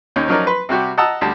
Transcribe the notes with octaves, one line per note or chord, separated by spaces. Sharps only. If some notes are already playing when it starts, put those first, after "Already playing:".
D#2 C#4 D#4
F3 F#3 C#4 D#4 A#4 D5
B4 C6
C3 G3 F#4 G4
D#5 F#5 A5 A#5 D#6 E6
D2 G3 A5